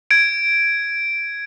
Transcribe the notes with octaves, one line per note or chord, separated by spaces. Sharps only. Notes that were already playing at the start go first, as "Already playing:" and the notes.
G#6 D7